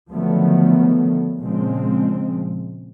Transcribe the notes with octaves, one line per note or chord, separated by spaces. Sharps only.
D3 D#3 F3 F#3 A3 B3
A#2 C#3 F3 G#3 C4